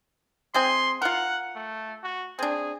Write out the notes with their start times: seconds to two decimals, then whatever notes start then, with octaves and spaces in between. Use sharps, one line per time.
0.54 G#3 C4 G#4 C6
1.02 F4 A#4 F#5
1.55 A3
2.03 F#4
2.39 C4 D4 G#4